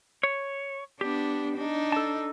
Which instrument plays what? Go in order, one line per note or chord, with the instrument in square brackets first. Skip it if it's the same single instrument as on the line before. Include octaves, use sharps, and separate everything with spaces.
[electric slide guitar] C#5
[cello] B3 D4 [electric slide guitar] G4
[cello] D4 D#4
[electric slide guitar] A4 A5